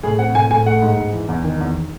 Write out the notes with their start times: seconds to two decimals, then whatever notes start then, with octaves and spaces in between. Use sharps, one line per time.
0.03 A2 G#4
0.19 C4 F#5
0.35 A2 G#5
0.50 A2 G#5
0.66 A3 F#5
0.82 G#2
0.97 G#2
1.13 E3
1.29 E2
1.44 D#3
1.60 E2